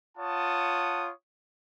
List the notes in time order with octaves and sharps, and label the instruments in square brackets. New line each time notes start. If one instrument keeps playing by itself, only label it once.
[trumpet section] F4 C#5 F#5 A5 D#6